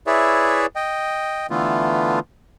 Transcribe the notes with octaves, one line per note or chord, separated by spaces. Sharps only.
E4 G#4 B4 C#5 D5 E5
D#5 G5
D3 E3 A3 B3 F4